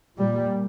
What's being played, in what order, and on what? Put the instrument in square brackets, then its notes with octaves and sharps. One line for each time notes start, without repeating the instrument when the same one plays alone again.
[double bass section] A#2 G3